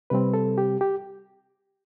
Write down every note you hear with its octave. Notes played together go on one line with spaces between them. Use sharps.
C3 G3 C4 B4
A4
G4
G4